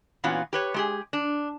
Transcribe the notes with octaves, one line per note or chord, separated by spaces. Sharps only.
A#2 E3 B3 C#4 F4 F#4
G4 B4 C#5
G#3 G4 G#4
D4